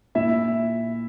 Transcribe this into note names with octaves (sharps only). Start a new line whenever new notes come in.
A#2 E4 E5